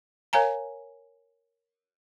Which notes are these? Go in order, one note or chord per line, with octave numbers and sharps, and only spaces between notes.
A#4 C#5 F5 G#5 A#5